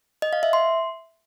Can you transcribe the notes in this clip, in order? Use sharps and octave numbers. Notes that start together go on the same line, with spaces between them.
D#5
F5
E5
C6